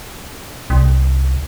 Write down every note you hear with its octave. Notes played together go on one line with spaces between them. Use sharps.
C2